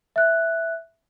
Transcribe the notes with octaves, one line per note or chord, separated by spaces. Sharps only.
E5 F#6